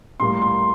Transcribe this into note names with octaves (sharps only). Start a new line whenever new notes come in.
A2 G3 A#3 C6
C6